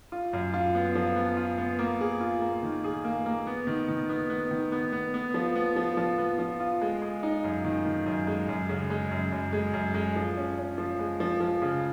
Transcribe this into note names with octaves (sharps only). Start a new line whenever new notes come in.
F4
F#2
F4
B3
F3
B3
F4
B3
A#3
G#4
F4
A#3
D#3
G#4
A#3
A#3
B3
D#3
D#3
B3
B3
D#3
B3
B3
B3
F3
B3
F3
F3
B3
F3
F4
G#3
G#3
D#4
F#2
D#3
D#3
F#2
G#3
F#2
C#3
G#3
F#2
F#2
G#3
F#2
G#3
F3
C#4
C#4
F3
G#3
F3
F3
C#3